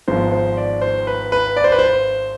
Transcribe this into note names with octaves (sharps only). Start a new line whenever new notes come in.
G#1 G#2 F3 B3 C5
C5
D5
C5
B4
B4
D5
C5
B4
C5